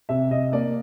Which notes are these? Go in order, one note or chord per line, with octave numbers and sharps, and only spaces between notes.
C3 E5
C3 D#5
A#3 D5